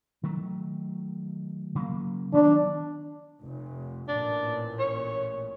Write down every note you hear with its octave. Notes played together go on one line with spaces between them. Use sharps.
D#3 F#3 A3
C#3 F#3 A#3
D#3 F#3 B3 D4
F1
A1 A#2 D4
C#5